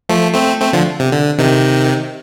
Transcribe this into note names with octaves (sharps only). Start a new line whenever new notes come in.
F3 A3
A3 C4
A3 C4
D3 F3
C3
D3
C3 D#3